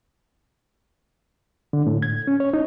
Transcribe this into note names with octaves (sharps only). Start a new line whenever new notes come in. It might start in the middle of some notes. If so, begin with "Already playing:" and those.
D3
A2
G#6
C#4
C#5
D#4